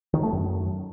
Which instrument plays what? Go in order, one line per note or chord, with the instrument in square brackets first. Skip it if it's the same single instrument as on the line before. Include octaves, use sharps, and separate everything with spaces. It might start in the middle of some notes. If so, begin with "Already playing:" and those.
[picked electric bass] D#3
A3
F#2